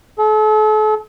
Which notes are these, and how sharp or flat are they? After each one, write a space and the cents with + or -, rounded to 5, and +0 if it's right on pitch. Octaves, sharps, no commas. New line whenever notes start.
A4 -40